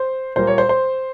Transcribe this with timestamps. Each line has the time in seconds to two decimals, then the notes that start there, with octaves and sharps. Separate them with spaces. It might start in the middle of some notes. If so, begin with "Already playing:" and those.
Already playing: C5
0.36 A#2 G3 A#3 C5
0.47 C#5
0.58 C5
0.69 C5